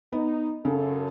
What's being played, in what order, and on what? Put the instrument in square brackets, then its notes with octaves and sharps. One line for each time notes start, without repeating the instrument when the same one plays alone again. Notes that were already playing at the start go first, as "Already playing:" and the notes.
[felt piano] B3 [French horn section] D#4
[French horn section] F#2 A4 [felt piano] C#3